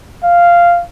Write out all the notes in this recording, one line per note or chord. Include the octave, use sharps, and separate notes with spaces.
F5